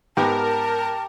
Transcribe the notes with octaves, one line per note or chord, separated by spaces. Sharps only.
G#2 B3 G4 A#4 A5